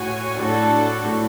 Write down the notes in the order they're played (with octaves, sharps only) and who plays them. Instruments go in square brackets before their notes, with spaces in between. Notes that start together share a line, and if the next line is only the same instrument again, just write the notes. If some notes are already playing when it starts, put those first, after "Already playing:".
Already playing: [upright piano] A2 [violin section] F#4 C#5 G#5
[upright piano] A2 [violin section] D4 F#4 A4
[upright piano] A2